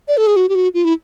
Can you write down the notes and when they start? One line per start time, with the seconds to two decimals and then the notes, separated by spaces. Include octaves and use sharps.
0.08 D5
0.17 A4
0.27 G#4
0.36 F#4
0.49 G4
0.55 F#4
0.74 F4
0.85 E4